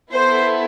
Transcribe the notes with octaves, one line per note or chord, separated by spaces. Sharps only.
B3 E4 A4 C5